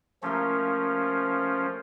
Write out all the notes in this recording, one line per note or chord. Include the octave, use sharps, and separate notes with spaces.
F3 A3 A#3 C#4 G4